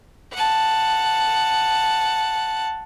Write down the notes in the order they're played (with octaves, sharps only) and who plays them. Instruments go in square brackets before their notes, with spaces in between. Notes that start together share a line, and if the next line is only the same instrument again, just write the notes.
[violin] F#5 A5